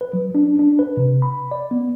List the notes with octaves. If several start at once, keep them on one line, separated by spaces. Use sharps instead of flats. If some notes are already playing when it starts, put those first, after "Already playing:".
B4
F#3
D4
D4
B4
C3
B5
D5
B3